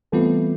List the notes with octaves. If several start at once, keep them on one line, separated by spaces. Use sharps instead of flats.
E3 G3 A3 B3 C4 F4